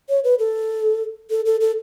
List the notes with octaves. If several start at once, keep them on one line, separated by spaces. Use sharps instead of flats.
C#5
B4
A4
A4
A4
A4